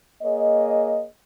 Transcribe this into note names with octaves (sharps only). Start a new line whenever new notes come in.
A#3 G#4 C#5 D#5